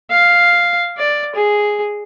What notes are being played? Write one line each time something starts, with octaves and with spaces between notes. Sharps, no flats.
F5
D5
G#4